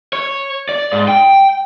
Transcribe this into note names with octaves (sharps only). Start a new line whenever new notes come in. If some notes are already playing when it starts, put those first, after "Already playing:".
C#5
D5
G#2
G5